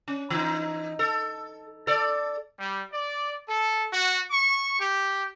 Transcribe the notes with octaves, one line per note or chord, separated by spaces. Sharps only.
C#4
E3 D#4
A4
A4 D5
G3
D5
A4
F#4
C#6
G4